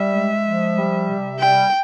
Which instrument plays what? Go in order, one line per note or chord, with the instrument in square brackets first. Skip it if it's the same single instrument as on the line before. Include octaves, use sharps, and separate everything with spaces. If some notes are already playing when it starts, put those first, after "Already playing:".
Already playing: [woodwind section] G3 [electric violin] E5
[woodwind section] G#3
F3
G3
C3
[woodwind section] G3 [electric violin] G5